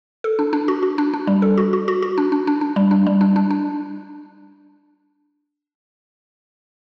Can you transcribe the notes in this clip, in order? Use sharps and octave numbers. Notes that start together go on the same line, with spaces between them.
A4
D4
D4
F#4
F#4
D4
D4
G3
A4
F#4
F#4
F#4
F#4
D4
D4
D4
D4
G3
D4
G3
D4
D4
D4